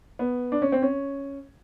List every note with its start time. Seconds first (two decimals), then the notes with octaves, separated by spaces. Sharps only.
0.19 B3
0.52 D4
0.62 C#4
0.72 C4
0.82 C#4